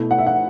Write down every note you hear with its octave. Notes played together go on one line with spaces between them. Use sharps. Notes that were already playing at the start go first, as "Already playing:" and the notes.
Already playing: B2 A3 E4
F#5
E5
F#5